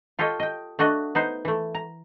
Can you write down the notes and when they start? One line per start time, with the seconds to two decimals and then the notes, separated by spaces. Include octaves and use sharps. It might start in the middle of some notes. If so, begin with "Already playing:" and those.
0.19 F4 G4 A4 C#5 D#5
0.40 D#5 G5
0.79 A3 D4 F#4 D#5 F#5
1.15 B3 D#4 C5
1.45 E3 A3
1.74 A#5